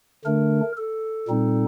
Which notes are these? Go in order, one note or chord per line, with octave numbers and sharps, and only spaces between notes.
D3 A3 D4 A#4
A4
A#2 G3 C4 D#4